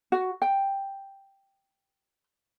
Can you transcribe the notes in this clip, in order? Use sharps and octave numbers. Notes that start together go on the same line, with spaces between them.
F#4
G5